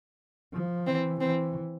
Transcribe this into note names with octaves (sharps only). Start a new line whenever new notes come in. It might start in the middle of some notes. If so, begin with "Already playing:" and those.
F3
E3 C4
E3 C4